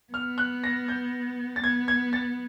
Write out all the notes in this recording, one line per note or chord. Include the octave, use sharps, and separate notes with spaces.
B3 F6
F#6
A#6
G6
A6
B3 G#6
G#6
A6